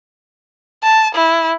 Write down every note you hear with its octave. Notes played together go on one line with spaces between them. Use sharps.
A5
E4